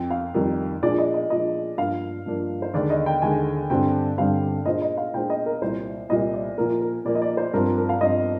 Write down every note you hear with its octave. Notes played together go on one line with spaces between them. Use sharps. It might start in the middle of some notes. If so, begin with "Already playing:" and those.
Already playing: F2 G5
F5
F2 D#3 G3 A#4
A#2 F3 G#3 D4 G#4 D5
D#5
D#5
A#2 F3 G#3 D4 G#4 D#5
G2 F3 A#3 D4 F5
G2 F3 A#3 D4
C5
D#2 D3 G#3 D5
D#5
G5
D#2 D3 G#3 G#5
G2 D3 G3 C4 G5
G2 D3 G3 C4 F5
A#2 G#3 D4 F4 C5 D#5
D#5
F5
A#2 G#3 D4 F4 C5 G5
D#5
A#4
C2 A#2 G3 C5
C2 A#2 G3 D#5
D5
A#2 F3 A#3 A#4
A#4
A#2 F3 A#3 D5
D#5
D5
C5
G2 F3 C4 A#4
A#4
A#4
F5
G2 F3 C4 D#5